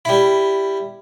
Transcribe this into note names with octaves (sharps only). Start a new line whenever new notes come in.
G3 E4